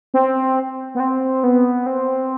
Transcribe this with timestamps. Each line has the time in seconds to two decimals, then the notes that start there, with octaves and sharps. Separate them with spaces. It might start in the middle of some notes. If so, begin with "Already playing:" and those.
0.14 C4
0.95 B3
1.00 C4
1.44 B3
1.86 C4